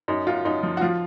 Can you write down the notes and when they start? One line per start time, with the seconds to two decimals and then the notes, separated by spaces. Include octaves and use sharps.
0.08 F#2 D#4
0.27 F#2 F4
0.45 F#2 D#4
0.63 F3
0.77 F#4
0.81 F3 F4